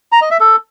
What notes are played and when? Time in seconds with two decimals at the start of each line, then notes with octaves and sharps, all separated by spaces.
0.12 A#5
0.21 D#5
0.31 E5
0.40 A4